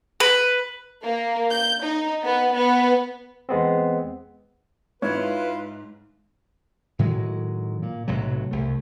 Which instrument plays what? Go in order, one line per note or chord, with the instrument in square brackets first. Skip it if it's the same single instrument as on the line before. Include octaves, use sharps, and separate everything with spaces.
[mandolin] B4
[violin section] A#3
G6
D#4
B3
B3
[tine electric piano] E2 G#3 B3 C4
[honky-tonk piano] G#2 [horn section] E4 F4 [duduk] B4 [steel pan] C#5
[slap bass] A2 D#3 F#3 G#3
A#2
B1 A2 C3 F#3
C2 A3